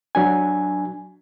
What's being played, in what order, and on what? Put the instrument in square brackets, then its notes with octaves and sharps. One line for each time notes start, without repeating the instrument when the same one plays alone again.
[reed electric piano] F#3 D4 G#5